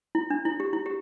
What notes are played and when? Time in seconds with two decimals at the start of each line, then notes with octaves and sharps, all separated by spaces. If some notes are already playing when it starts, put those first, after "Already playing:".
0.15 E4
0.30 D4
0.45 E4
0.60 G4
0.73 E4
0.86 G4